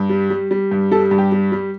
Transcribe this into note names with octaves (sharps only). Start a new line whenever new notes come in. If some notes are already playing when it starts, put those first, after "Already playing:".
Already playing: G2
G3
G3
G3
G2
G3 A4
G2
G4
G3
G3